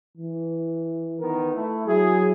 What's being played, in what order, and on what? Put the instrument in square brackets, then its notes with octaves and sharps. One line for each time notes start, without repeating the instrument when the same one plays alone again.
[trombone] E3
[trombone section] D#3 B3 A#4
A3 E4
[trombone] F#3 [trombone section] E4 G#4